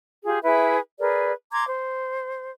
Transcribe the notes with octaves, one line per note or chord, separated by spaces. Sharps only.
F4 G4 G#4
E4 G#4 B4 E5
G#4 A#4 B4 D5
A#5 C6 D6 G#6
C5